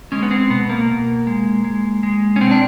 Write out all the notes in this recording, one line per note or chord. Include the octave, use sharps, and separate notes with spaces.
G#3 C#4
B3
C4
B2 B3
A#3
B2
G#3
G#3
G#3
C#4
B2 C4
D4